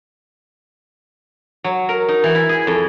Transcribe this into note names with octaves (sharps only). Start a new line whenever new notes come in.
F#3
A#4
D#4
E3
E4
G#4
F2